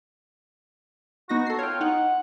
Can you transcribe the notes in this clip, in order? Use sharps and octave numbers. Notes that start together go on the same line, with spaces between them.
B3 D#4 F#4 A#6
A4 C7
F4 C#5 G5
D#4 F#5